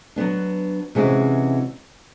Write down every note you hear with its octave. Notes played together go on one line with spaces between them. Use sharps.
F#3 B3 D4
C3 E3 G#3 C#4 F#4